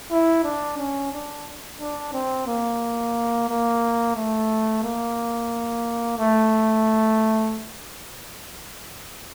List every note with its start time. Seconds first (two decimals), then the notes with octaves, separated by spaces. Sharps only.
0.11 E4
0.44 D4
0.78 C#4
1.12 D4
1.80 D4
2.13 C4
2.47 A#3
3.49 A#3
4.15 A3
4.83 A#3
6.18 A3